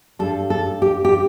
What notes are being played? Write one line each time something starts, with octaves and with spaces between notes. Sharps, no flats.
G2 G3 A4
A4
G4
G4